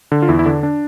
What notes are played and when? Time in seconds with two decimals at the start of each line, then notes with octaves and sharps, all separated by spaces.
0.12 D3
0.22 F4
0.28 E2 E4
0.39 E4
0.45 D3 D4
0.63 D4